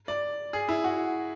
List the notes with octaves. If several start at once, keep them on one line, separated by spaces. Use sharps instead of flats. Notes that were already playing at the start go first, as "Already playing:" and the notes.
D5
G#4
E4
F#4